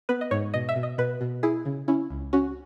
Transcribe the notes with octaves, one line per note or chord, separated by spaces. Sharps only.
B3 B4
D#5
G#2 C#5
B2 D#5
E5
B2
D#5
B2 B4
B2
E4 G#4
C#3
C#4 E4
C#2
C#4 F#4